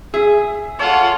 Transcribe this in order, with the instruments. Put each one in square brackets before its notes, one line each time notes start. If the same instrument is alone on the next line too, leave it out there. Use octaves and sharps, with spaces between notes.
[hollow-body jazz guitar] G#4 [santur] E5
[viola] F4 [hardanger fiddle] A4 F#5 [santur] C#5